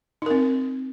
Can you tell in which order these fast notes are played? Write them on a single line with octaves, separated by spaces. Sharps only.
D#4 A#4 C4